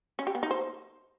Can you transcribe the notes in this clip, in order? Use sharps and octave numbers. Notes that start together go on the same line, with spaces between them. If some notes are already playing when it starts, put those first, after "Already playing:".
C#4
G4
B3
D#4
C5